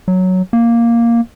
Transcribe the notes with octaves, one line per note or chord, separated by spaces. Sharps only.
F#3
A#3